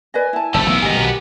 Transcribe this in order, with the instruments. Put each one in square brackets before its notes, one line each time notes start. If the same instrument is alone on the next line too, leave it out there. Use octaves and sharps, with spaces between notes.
[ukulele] B4 D5 D#5 [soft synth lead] G#5
[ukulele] E4 A5
[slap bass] F#1 D2 [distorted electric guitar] G3 A3 [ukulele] A5 [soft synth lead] E6
[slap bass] B1 E3 A3 [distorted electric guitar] B3 A#4 [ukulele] F5
[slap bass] G#1 D2 [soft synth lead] G4 [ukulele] D#5 G#5
[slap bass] B1 B2 D#3